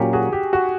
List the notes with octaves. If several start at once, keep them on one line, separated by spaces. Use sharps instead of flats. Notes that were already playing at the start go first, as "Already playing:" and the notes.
Already playing: A#2 F#3 A#3 C#4 G4
F#4 G#4
G4
F#4